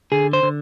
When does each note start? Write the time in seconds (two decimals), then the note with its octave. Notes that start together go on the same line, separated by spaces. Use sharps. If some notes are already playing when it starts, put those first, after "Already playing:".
0.12 D3 G#4
0.33 C5
0.43 D3